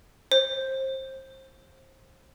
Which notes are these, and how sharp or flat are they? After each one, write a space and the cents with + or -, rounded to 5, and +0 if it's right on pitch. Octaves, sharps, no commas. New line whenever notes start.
C5 +25